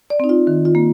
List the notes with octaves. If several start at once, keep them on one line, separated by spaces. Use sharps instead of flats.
D5
C4 D#4
F4
D#3
F4
A#3